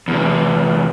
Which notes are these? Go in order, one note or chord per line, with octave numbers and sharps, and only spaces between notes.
E2 C3